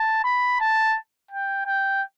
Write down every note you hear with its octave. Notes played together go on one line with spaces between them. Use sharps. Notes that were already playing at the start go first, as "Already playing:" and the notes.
Already playing: A5
B5
A5
G5
G5